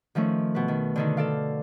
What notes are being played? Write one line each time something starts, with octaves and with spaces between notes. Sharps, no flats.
D#3 F3 A3 C#4
B2 B4
D#3
D3 D#3 D#4
A4 D5 F5